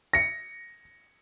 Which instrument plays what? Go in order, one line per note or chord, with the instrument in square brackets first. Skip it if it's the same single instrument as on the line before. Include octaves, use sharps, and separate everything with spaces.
[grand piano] A#6 C#7